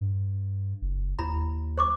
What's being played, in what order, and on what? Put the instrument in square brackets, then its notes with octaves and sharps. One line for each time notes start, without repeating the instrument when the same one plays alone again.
[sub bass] G2
F#1
[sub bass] D#2 [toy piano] E4 A#5 B5
[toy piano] C5 C#6 D6